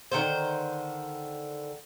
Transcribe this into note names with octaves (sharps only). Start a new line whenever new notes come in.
D3 D#3 C4 C5